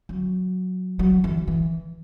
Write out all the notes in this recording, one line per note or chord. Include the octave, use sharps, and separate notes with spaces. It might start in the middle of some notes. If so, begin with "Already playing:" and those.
F#3
F#3
E3
E3